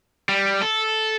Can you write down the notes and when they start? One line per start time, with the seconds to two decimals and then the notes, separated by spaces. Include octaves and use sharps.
0.29 G3
0.62 A4